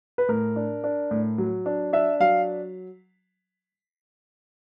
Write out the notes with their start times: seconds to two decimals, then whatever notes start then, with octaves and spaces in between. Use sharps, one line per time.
0.18 B4
0.29 A2 A#4
0.56 D4
0.84 D4
1.11 A2
1.38 F#3
1.66 D4
1.93 D4 E5
2.20 F#3 F5